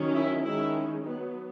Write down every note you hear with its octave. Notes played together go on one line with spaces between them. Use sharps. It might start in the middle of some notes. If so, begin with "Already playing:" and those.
Already playing: D#3 F#3 C#4
E4
D#3 G#3 C#4 E4
F#3 B3 D#4